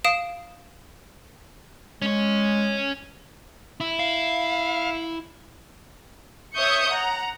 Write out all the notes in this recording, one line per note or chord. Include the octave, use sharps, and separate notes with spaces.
F5 D#6 D7 E7
G#3 C#4 C#5
E4
F5
C#5 E5 C#6 D#6 G6 C#7
F#5 A#5